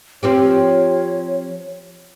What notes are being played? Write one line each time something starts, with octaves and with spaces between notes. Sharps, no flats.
F3 C4 G4 C#5